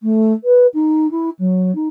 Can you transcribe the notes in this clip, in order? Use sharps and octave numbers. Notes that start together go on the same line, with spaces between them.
A3
B4
D#4
E4
F#3
D#4